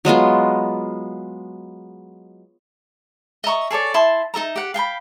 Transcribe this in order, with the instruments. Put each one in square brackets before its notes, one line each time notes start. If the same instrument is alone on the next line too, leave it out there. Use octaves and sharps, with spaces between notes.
[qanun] F#3 G#3 B3 F4
[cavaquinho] D#5 E5 A#5 C#6
G#4 A4 C#5 D5
E4 A5 C6
D#4 A4 E5 A#5
G4 F#5
F5 G5 G#5 B5